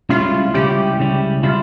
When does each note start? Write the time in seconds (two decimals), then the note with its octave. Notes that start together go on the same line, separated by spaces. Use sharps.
0.09 C#2 C#3 G3 C#4 E4 F4
0.54 C#2 C#3 G3 C#4 E4 G4
0.98 C#2 C#3 G3 C#4 E4
1.43 C#3 G3 C#4 E4 F4